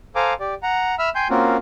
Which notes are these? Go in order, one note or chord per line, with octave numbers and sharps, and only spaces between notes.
A4 C5 F5 G#5 A#5 D6
G4 D5
F#5 A#5
E5 B5 E6 F6
G5 G#5 C6 G6
A#3 C4 C#4 F4 F#4 A#4